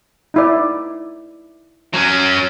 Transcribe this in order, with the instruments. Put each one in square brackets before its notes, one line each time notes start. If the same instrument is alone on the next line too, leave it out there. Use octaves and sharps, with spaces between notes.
[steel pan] D#4 E4 D5
[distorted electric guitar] F#3 C#4